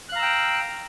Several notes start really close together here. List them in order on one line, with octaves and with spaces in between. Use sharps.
F#6 F5 A#5 E6 G5